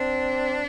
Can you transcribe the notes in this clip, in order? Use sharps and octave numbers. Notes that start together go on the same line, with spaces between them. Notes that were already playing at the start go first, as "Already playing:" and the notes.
Already playing: C4 D4